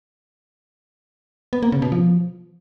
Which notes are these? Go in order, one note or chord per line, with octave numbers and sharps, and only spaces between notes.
B3
A#3
C#3
B2
F3